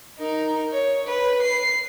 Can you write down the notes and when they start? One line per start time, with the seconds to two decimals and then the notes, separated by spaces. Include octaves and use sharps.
0.19 D#4 A#4
0.72 C#5
1.07 B4
1.42 C7